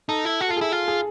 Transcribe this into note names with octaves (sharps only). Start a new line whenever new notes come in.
D#4 A4
E4
F#4
F4 A4
E4 G#4
F4
G#4